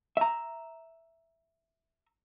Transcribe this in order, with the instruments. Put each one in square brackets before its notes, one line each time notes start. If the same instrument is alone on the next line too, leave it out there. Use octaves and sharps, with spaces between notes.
[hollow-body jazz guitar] E5 A#5